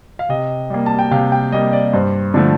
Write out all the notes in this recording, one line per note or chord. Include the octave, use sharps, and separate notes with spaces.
F5
C3 D#5
G3 A#3
A5
G5
C3 F5
G5
G3 A#3 D#5
D5
G2 C5
D3 F3 A3